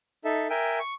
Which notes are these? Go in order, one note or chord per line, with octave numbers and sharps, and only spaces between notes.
D#4 A4 E5
A#4 E5 G5 G#5
C#6